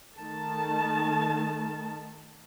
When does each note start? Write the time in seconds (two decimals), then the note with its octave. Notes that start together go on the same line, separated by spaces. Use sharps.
0.17 D#3 A3 A5